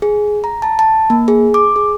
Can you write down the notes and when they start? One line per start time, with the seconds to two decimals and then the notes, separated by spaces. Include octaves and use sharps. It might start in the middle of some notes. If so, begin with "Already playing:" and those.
0.02 G#4
0.44 A#5
0.62 A5
0.79 A5
1.10 A#3
1.28 G#4
1.54 D6
1.76 G#4